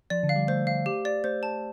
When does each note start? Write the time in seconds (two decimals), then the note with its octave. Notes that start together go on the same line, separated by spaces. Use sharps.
0.10 F3 D5
0.23 D3
0.29 F5
0.36 G3
0.48 A3 C5
0.67 F5
0.86 G4
1.05 D5
1.24 A3 C5
1.43 A5